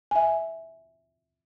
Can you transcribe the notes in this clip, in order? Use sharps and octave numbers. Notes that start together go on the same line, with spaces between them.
E5 G#5